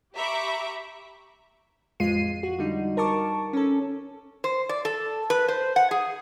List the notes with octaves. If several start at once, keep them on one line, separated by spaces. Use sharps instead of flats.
G4 E5 A#5 B5 C#6 D6
A1 F2 G#3 F4 C7 D#7
F#4
D3 G3 D#4
A#4 A5 C#6 D6
C#4 A4
C5
D5
A4
B4
C5
F#5
G#4